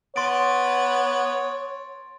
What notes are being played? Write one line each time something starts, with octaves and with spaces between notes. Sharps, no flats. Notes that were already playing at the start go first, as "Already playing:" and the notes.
B3 C#5 C6 A6 D7